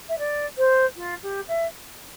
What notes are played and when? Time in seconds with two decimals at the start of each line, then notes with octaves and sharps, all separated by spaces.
0.08 E5
0.18 D5
0.58 C5
0.96 F4
1.22 G4
1.47 E5